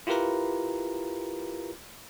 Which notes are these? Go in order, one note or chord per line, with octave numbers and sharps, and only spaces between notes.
E4 F4 G4 A#4 B4 A#5